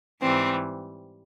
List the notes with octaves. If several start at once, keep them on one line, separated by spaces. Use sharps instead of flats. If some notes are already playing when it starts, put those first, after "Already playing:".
G#2 E3 G3 C4